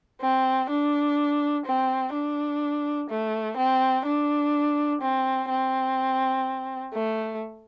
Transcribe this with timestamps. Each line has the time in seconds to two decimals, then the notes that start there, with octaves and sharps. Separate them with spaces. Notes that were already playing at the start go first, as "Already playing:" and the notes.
0.21 C4
0.70 D4
1.66 C4
2.13 D4
3.10 A3
3.57 C4
4.06 D4
5.02 C4
5.49 C4
6.94 A3